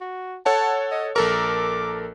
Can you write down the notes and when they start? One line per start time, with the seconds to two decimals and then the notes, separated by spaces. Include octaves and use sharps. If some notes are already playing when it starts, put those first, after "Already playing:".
0.01 F#4
0.46 A4 C#5 F#5 A5
0.92 D#5
1.16 A#1 A4 A#4 D6